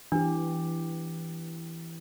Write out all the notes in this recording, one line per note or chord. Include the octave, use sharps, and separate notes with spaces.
E3 D4 G4